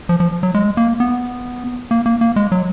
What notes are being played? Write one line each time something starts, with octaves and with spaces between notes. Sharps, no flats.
F3
F3
F#3
G#3
A#3
B3
A#3
A#3
A#3
G#3
F#3